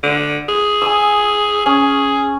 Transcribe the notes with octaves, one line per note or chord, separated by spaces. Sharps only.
D3
G#4
G#5 D#6 E6
C#4 G#4